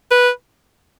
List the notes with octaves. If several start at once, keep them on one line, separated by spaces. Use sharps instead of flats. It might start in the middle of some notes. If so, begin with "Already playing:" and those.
B4